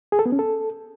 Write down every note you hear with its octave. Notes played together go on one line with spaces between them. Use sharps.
G#4
A4
B3
C#4
A4